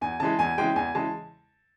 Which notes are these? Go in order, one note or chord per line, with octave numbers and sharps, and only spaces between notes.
E2 G#5
C#3 E3 G#3 A5
E2 G#5
C#3 E3 G#3 G5
E2 G#5
C#3 E3 G#3 A5